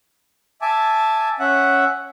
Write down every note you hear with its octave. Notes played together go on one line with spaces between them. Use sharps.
E5 G#5 A5 D6
C#4 E5 F#5